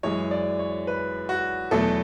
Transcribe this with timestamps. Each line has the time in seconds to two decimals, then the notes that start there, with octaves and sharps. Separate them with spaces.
0.03 F#2 E3 G#3 C#5
0.31 D5
0.59 C#5
0.87 B4
1.29 F#4
1.71 E2 B2 F#3 A3 A4